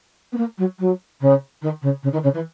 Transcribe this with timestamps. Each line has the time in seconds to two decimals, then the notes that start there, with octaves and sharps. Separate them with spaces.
0.32 B3
0.37 A#3
0.58 F#3
0.79 F#3
1.21 C#3
1.62 D#3
1.82 C#3
2.03 C#3
2.12 D#3
2.23 C#3
2.34 E3